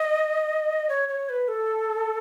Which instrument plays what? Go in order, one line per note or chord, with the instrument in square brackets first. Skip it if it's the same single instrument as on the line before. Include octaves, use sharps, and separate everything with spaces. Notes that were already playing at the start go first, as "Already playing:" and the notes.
Already playing: [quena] D#5
C#5
C#5
B4
A4